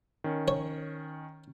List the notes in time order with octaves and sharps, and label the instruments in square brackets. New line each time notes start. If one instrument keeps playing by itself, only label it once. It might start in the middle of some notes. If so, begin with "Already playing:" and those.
[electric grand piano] D#3 C#4
[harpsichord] C#5